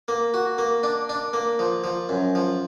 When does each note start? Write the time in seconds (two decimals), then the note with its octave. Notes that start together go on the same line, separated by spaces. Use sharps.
0.08 A#3
0.34 F#4
0.58 A#3
0.83 D4
1.09 D4
1.33 A#3
1.59 F3
1.84 F3
2.09 F#2
2.35 F3